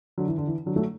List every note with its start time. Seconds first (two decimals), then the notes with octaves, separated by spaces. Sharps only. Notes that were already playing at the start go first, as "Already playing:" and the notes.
0.18 D3 F#3
0.28 E3
0.38 D3
0.47 E3
0.66 D3 F#3
0.76 F#3 A3